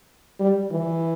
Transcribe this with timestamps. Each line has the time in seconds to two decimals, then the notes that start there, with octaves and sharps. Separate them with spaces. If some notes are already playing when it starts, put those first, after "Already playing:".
0.40 G3
0.71 E3